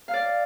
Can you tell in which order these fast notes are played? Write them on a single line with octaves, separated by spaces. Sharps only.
F5 F6 D5